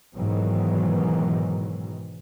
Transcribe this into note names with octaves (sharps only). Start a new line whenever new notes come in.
G#2 B2 D#3 E3 F#3